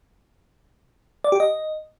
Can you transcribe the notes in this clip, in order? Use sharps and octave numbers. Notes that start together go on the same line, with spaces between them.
D5
G4
D#5